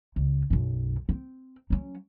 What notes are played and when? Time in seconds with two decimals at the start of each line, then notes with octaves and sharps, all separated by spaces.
0.16 C#2
0.50 B1 F#2
1.09 C4
1.70 F#3 C#4